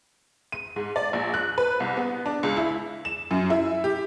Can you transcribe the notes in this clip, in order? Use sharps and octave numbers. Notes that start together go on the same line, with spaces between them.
D#7
G#2
D5
A#1
F#6
B4
C2
B3
D4
C#2
E4
E7
F#2
E4
G4